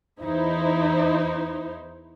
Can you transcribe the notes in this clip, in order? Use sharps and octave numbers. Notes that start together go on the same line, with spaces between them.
E2 D#4 E4 C5